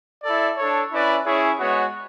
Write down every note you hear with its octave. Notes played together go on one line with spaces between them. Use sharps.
E4 A4 D5
D4 A4 C#5
C#4 E4 B4 D5
C#4 E4 G#4 C#5
G#3 B3 F#4 C#5